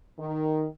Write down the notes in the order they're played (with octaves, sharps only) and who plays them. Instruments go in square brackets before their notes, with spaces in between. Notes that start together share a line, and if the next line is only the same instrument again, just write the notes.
[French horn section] D#3